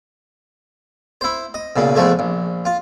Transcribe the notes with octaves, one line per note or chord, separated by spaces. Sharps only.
E4 C5
D#5
B1 A#2 C#3
E2 A2 F3 G#3 A3
A#1
F4